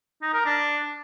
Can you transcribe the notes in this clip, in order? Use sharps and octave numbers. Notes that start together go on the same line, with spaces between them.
D#4
A#4
D4